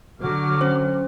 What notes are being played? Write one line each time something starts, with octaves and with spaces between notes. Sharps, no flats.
D3 F#3 F#4 D6 F6
C#4 C5